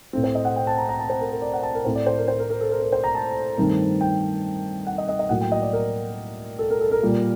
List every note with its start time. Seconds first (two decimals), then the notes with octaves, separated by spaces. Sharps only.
0.13 A2 A3 C4
0.24 C5
0.35 D#5
0.45 F#5
0.56 G5
0.67 A5
0.77 A#5
0.89 A#5
0.99 A5
1.09 C5
1.21 A#4
1.32 A#4
1.42 D5
1.53 F#5
1.63 A5
1.74 A#4
1.85 A2 A3 C4 C5
1.95 D5
2.06 C5
2.18 A#4
2.28 C5
2.39 A#4
2.50 A#4
2.61 A4
2.71 A#4
2.82 A#4
2.92 C5
3.04 A#5
3.15 A5
3.58 G2 D#3 A3 C4
4.01 G5
4.87 F#5
4.98 D#5
5.09 D#5
5.19 D#5
5.29 A2 F#3 A#3 F#5
5.41 G5
5.52 D#5
5.62 D5
5.73 A#4
6.59 A4
6.70 A#4
6.81 A4
6.91 A#4
7.03 A#2 G3 A#3